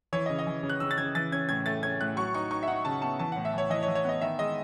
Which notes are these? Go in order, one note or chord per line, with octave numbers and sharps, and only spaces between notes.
E3 C#5
D#5
C#3
D#5
E3
C#3
F#6
C#3 E6
A6
C#3 G#6
E3 A6
C#4 G#6
A2 G#6
A3 A6
C#4 G#6
A2 F#6
F#3 C#6
D#4 C#6
D#4 C#6
E5
D#4 F#5
C#3 A5
B3 A5
E3 A5
F#5
A2
E5
E3 C#5
E3 D#5
C#5
E3
C#5
B3 D#5
D#3 E5
G#3 D#5